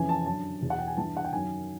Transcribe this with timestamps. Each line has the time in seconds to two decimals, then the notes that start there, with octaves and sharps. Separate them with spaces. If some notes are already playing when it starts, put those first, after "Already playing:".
Already playing: F2 C#3 E3 G#5
0.09 A5
0.26 F#2 D3 A5
0.61 E2 B2
0.70 F#5
0.78 G5
0.87 G#5
0.97 G2 E3 A5
1.17 F#5
1.24 G5
1.32 F#2 D#3 G#5